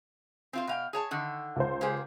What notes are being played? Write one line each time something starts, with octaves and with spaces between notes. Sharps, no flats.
C4 F4 C5
B2 F5 G5
G#4 C#5 A5
D3 D#3
C#2 C5
A#3 G4 G#4